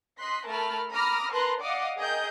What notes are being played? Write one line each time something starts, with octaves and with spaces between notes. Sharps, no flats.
D#5 C6 F#6 B6
A3 A#4 A5 B5 F6
A#5 B5 D6 D#6 F6 A#6
A#4 B4 A5 A#5 C6 F#6
D5 D#5 F5 F#5 D6 D#6
G#4 A#4 D#5 G5 G6